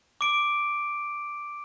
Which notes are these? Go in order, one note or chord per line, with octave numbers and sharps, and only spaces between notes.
D6 D7